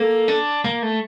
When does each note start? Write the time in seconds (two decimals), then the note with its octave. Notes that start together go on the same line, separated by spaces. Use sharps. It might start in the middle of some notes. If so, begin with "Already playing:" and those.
Already playing: A#3 A4
0.28 D4
0.64 A#3
0.83 A3